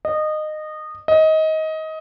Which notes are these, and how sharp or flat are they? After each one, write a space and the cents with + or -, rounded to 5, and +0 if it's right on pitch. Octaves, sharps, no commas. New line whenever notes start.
D#5 -20
D#5 +20